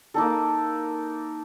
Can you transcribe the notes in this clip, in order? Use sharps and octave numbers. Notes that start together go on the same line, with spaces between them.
A#3 D#4 A4